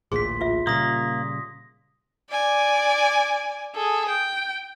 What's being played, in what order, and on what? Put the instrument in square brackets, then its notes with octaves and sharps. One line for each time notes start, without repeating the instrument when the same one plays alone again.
[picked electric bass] A1 D2 A#2 [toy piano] G#4 [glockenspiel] C6 B6
[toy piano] F4 E5
[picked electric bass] A#2 C#3 G3 [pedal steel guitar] A#3 [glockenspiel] D#6 A#6
[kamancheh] D5 G#5
G#4 A4
G5